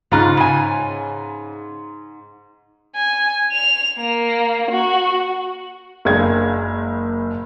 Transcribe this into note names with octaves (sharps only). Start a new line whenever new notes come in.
G#2 C#3 F4 A#5 F#6
C#3 G#5
G#5
F7
A#3
F#4
F#1 G#3 A#3 D4 F5 G#6